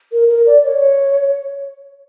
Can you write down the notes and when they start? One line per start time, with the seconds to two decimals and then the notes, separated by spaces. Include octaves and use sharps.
0.12 A#4
0.30 A#4
0.46 D5
0.64 C#5